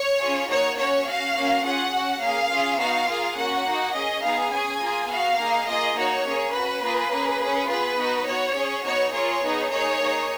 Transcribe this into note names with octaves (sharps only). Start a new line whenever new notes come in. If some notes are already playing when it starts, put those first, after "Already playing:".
Already playing: C#5
C#4 F4 G#4
A#3 D#4 F#4 C#5
C#4 F#4 C#5
C#4 F#4 F5
A#3 C#4 F#4
C#4 F4 G#4 F#5
C#4 F#4
A#3 C#4 G#4 F5
C#4 F4 G#4
B3 D#4 F#4 F5
A#3 F4 G#4
A#3 C#4 F#4 F#5
A#3 D#4 F#4
C#4 G#4 D#5
B3 D#4 G#4 F5
C#4 G#4 G#5
A#3 F4 G#4
B3 F#4 F5
A#3 D#4 G#4
A#3 F4 G#4 D#5
A#3 D#4 F#4 C#5
A#3 C#4 G#4
C#4 F#4 B4
A#3 F4 G#4
A#3 C#4 G#4
C#4 G#4
B3 F4 G#4 B4
B3 D#4 F#4
B3 F#4 C#5
C#4 G#4
B3 D#4 F#4 C#5
A#3 F4 G#4 C#5
B3 D#4 G#4
A#3 D#4 G#4 C#5
A#3 D#4 G#4